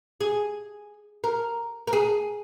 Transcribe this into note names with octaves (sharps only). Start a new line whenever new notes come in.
G#4
A#4
A#4
G#4